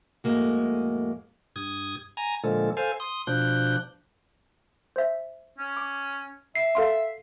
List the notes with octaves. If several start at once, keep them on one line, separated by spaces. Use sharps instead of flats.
F2 A2 G#3 A#3 F#4
G2 D#6 G#6
G#5 A#5
A#2 D3 F3 G#3 A4
A4 C5 F5 G#5
C6 D#6
B2 F3 D4 F#6 G6
C5 E5
C#4
D6
E5 C7
A4 F5 C6